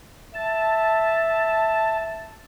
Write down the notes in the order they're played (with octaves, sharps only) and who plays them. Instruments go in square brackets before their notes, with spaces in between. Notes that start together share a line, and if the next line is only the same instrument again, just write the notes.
[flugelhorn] E5 [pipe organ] A5